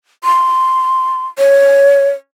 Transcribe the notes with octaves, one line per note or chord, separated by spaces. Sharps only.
C6
C#5